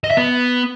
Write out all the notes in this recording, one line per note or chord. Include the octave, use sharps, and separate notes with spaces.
D#5
E5
B3